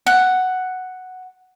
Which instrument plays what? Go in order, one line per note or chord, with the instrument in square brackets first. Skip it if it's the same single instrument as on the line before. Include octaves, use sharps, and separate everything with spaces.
[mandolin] F#5